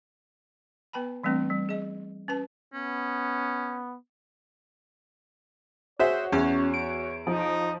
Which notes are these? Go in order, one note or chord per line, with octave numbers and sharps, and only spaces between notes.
B3 B4 G5 A5 B5
E3 G3 A3 C4 D4
G3
G#4 D#5
C#4 B4 A5
B3 C#4
F#4 G#4 C5 C#5 E5
E2 C#4
D7
F3 D#4